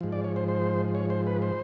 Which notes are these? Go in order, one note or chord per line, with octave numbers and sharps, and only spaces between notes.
G#2 F3
D5
C#5
C5
C5
C#5
C5
B4
C5